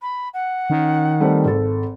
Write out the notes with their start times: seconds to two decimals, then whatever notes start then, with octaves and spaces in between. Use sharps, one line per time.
0.01 B5
0.33 F#5
0.70 D#3 C#4
1.20 G3 A3 C4
1.45 G#1 A4